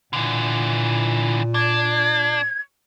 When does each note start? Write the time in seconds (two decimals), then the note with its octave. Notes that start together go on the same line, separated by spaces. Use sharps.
0.13 A#2 D3 E3
1.54 D4 G#6